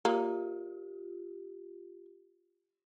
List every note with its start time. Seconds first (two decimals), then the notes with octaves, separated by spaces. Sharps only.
0.05 A#3 F4 G4